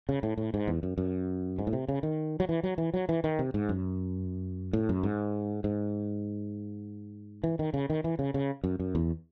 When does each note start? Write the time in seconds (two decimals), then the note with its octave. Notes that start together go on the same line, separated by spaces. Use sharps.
0.09 C#3
0.23 A2
0.38 A2
0.54 G#2
0.68 E2
0.83 F#2
0.98 F#2
1.59 G#2
1.67 A2
1.73 C3
1.88 C#3
2.03 D#3
2.40 F#3
2.49 E3
2.63 F#3
2.78 E3
2.94 F#3
3.09 E3
3.24 D#3
3.39 C3
3.54 G#2
3.69 F#2
4.73 A2
4.89 F#2
5.03 G#2
5.64 G#2
7.44 E3
7.59 D#3
7.74 C#3
7.90 D#3
8.04 E3
8.19 C#3
8.34 C#3
8.64 F#2
8.80 F#2
8.95 E2